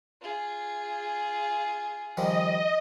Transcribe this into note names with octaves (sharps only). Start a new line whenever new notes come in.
F4 G#4
D#3 F3 G3 D#5